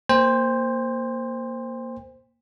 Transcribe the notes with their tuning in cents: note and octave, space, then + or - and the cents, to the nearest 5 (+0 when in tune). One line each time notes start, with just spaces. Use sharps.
A#3 +0 C5 +0 G5 +40